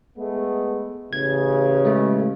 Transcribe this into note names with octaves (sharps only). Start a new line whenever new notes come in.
G#3 A3 B3
A1 C#3 G#6
G#3 A3